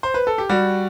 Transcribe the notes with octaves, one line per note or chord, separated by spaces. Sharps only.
C5
B4
A4
G4
G3 F#4